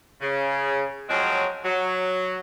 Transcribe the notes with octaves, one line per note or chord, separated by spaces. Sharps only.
C#3
F3 F#3 G#3 C4 C#4
F#3